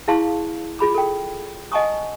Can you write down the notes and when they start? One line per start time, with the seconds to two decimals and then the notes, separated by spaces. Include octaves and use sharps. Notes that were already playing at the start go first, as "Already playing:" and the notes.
0.08 E4 G#4 F5 A5 C6 C#6
0.79 F4 G#4 B5 D6
0.94 A4 G5
1.72 D#5 F#5 G#5 A5 C#6 D#6